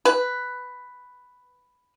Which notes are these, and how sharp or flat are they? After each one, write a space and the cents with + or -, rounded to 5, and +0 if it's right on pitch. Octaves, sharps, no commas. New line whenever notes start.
B4 +5